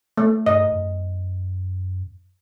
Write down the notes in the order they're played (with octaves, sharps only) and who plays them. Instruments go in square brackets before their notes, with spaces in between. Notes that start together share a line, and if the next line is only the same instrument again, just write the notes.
[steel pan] A3
[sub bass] G2 [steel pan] D#5
[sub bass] F#2